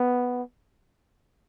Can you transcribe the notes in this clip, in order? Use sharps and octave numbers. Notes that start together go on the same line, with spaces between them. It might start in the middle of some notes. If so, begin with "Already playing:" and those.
Already playing: B3